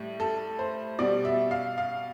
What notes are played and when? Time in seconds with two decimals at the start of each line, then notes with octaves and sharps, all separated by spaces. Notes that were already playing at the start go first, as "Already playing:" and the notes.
Already playing: A2 G3
0.20 A4
0.59 C5
0.99 B2 G3 D5
1.25 E5
1.51 F5
1.78 F5